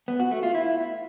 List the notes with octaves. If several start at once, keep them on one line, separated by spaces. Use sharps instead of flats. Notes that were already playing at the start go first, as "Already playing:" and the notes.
B3
F#4
A3
F4
E4